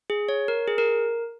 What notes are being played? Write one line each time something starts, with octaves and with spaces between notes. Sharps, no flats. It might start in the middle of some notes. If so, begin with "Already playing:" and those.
G#4
C#5
A#4
G#4
A#4